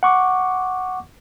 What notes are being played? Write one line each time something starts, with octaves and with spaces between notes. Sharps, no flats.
F#5 C#6 D6